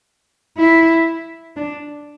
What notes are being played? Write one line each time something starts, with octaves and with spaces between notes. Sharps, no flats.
E4
D4